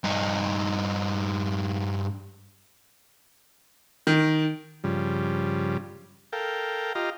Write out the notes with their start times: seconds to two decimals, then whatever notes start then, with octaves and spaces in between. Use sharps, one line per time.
0.04 G2 D#4
4.07 D#3
4.84 G2 C#3 F3 G3
6.33 A4 A#4 F5 G5
6.95 F4 G4 D#5 F5 A#5